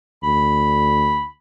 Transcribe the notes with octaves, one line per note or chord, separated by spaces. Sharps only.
D2 B5